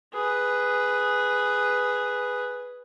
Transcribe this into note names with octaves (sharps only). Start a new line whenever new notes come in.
G#4 B4